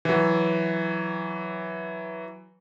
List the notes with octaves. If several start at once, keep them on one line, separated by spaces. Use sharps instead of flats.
E3 F#3